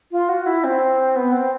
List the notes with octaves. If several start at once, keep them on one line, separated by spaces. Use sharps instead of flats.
F4
F#4
E4
C4
B3
C4